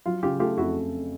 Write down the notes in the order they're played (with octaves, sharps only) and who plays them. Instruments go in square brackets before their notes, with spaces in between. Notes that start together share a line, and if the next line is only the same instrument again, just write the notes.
[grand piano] F#3 [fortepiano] F4
[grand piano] C#3 [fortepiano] F4 G4
[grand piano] A3 [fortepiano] F4 G4
[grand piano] F2 [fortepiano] E4 F#4